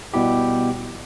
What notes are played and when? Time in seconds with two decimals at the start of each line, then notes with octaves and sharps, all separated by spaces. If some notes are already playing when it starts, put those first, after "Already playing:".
0.14 B2 G3 B3 E4 G4